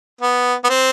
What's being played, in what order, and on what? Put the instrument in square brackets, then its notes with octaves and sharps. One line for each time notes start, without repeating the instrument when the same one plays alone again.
[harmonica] B3
B3
C4